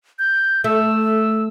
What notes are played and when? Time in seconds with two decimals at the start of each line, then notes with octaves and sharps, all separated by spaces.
0.19 G6
0.64 A3 E6